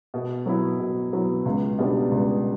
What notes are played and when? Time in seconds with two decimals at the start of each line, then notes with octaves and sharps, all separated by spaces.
0.14 B2
0.46 F#3 B3 E4
0.80 B2
1.13 F#3 B3 E4
1.46 C#2
1.78 B2 G3 B3 D4
2.11 C#2